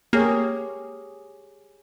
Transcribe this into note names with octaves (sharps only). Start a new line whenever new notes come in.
A#3 G4 G#4 C#5